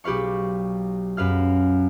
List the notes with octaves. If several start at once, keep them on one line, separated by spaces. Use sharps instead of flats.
B1 G4 B4 F5 C#6
F#2 B4 F5 F6